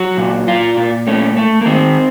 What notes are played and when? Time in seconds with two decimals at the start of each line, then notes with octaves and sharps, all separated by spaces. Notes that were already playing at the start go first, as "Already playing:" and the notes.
Already playing: F#3 F#4
0.17 A#2
0.47 A#2 F4
0.77 A#2
1.07 A3 C#4
1.37 A3
1.61 A#3
1.66 D#3 C4